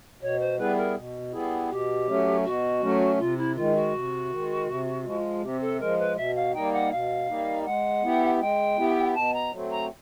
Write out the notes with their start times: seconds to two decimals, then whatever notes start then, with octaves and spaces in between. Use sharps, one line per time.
0.21 B2 C#5
0.39 C5
0.58 G3 B3 E4 G#4 B4
0.76 A#4
0.95 B2
1.33 G3 B3 E4 G#4
1.70 B2 G4
2.07 F#3 A3 C#4
2.44 B2 F#4
2.82 F#3 A3 C#4
3.18 C3 F4
3.37 E4
3.55 D#3 G#3 F4
3.74 F#4
3.93 C3
4.30 D#3 G#3
4.67 C3
5.05 F3 G#3
5.42 C3 G4
5.60 A4
5.79 F3 G#3 A#4
5.98 B4
6.16 B2 E5
6.35 F5
6.54 G3 A#3 D#4 G5
6.72 F#5
6.90 B2 F5
7.28 G3 A#3 D#4
7.65 G#3 F#5
8.03 B3 E4 G4
8.40 G#3 G5
8.77 B3 E4 G4
9.14 B2 A5
9.33 A#5
9.52 F#3 A3 C4
9.70 A#5